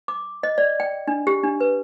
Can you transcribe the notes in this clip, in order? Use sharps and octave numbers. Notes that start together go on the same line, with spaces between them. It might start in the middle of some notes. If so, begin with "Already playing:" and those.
D6
D#5
D5
G5
D4
G4
D4
B4